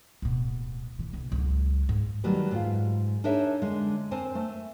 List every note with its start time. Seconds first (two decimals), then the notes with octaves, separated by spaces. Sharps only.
0.22 D1 B2
0.99 E3
1.13 B1 C#3
1.32 C#2 F#3
1.89 G#2
2.24 D#3 F#3 G3 A3 B4
2.51 G#2 F4
3.24 D4 D#4 G#4 A#4 C#5 E5
3.62 D3 G#3
4.11 C4 A#4 C5 G#5 A5
4.35 A3